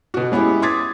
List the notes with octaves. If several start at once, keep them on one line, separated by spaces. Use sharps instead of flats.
B2 F#4
G#3 B3 C#4 E4 G4
C6 D6 D#6 G#6 A6 B6